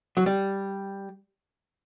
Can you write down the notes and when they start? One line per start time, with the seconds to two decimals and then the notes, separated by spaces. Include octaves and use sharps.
0.17 F#3
0.26 G3